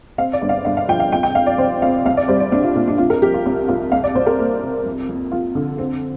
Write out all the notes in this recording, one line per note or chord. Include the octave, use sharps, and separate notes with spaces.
C4 F5
D5
G1
F5
G1 F5
F5
F3 G5
F5
F2 G5
G5
F2 F5
D5
C3 C5
F2 F5
C2 F5
D5
G3 C5
D5
C2 D4
F4
A#2 F4
D4
C2 F4
A#4
F3 G4
F4
C2
C2 F4
C2 F5
D5
C2 C5
A#4
A#3
C3
F2
F2
F2 F4
D3
C4